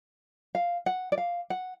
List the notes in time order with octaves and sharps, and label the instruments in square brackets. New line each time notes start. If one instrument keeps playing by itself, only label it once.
[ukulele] F5
F#5
D5
F5
F#5